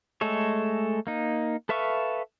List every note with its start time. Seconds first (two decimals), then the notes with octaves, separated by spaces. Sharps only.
0.21 G#3 A3 A4 C#5
1.07 A#3 D#4
1.69 A4 B4 E5 F5 C#6